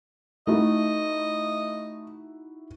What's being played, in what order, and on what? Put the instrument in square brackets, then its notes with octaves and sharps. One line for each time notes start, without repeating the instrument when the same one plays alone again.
[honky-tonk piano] A3 [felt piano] D#4 E4 F#4 [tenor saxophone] D#5